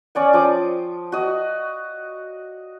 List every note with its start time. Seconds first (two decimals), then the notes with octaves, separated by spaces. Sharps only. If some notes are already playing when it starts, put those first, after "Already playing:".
0.15 C#4 D5 F#5
0.33 F3 G5 D6 D#6
1.12 F#4 D#5